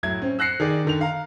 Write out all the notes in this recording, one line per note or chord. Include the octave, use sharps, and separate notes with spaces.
A2 F#3 E4 G#6
C4 C#4
E6 F#6 A#6 C7 C#7
D#3 G#4 D5
D3 D#3 F7
F5 A#5